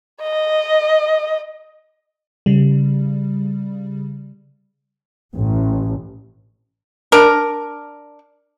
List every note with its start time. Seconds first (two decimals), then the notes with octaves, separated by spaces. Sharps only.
0.22 D#5
2.46 C#3 G3
5.36 A1
7.12 D4 A#4